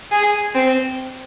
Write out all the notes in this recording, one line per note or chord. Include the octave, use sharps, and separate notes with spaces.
G#4
C4